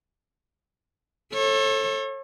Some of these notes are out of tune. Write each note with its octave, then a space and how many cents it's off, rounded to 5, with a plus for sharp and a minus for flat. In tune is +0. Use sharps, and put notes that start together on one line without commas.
A4 +0 C#5 -35